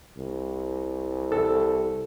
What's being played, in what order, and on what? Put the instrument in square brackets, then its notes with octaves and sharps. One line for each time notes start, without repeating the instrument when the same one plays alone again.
[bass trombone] C2
[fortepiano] A4